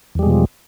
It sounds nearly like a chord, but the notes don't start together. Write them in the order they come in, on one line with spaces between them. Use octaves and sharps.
E2 G3 G#3 B2 F3